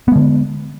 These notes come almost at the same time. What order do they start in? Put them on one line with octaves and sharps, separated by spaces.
B3 G#3 D3